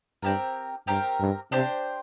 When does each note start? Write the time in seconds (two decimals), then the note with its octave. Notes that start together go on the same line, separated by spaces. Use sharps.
0.22 G2 C4 G4 A#4
0.87 G2 C4 G4 A#4
1.20 G2
1.52 C3 D4 G4 C5